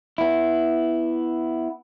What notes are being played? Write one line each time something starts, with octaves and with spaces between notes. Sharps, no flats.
B3 E4